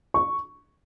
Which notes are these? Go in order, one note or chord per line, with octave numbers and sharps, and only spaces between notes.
C#6